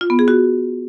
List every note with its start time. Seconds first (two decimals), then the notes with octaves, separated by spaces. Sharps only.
0.01 F4
0.10 B3
0.19 G#4
0.28 F#4